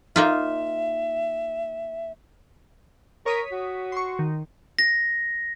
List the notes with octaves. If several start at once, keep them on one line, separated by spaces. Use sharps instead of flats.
A#3 D#4 F4 E5
A#4 C#5 D#6 B6
F#4
C6 C#6
D#3
A#6